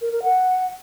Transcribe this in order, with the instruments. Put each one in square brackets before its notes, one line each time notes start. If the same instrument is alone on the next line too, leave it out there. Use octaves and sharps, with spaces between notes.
[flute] A#4
A#4
F#5